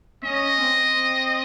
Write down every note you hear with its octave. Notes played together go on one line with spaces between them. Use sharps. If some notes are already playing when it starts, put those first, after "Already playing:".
C#4 D#5
C4